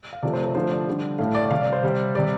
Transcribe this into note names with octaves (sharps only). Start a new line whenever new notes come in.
F5
C3 F3 A3 D5
C5
C5
D3 F3 A3 C5
D5
D3 G3
A2 A3 F5
D5
D5
C3 G3 F5
D5
C5
C3 G3
C3 G3 D5